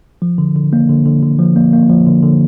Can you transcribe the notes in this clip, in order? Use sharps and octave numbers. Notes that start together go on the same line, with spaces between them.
F3
D3
D3
A#3
D3
D3
D3
F3
A#3
A#3
F3
D3
D3